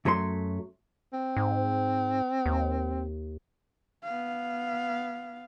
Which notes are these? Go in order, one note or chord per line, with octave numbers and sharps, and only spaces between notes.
F#2 F#3 A3 A#4 C6
C4
G#2
D#2
B3 F5